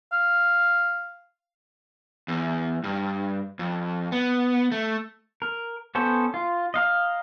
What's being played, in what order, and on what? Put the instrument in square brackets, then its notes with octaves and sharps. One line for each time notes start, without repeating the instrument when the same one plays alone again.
[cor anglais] F5
[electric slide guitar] E2
G2
F2
B3
A3
[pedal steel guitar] A#4
B3 C#4 A4 C5
F4
D#5 F5 A#5